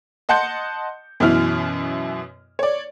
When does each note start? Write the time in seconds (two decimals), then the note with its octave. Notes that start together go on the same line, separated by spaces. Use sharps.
0.29 D#5 F#5 A5 C6 G6 C#7
1.20 F#2 B2 E3 B3 E4 F6
2.59 C#5 D5